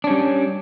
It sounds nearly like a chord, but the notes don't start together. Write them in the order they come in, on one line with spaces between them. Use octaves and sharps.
D4 C#4 G3